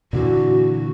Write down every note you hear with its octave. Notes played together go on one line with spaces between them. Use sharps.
A#2 D3 E3 F#4